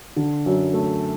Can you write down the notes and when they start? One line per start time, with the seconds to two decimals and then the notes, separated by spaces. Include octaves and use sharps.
0.16 D3
0.46 F#2
0.74 A3